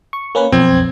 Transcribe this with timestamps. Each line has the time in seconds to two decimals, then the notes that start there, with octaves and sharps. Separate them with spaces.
0.13 C#6
0.35 A#3 C#4 B4
0.52 B1 F2 C4 G#6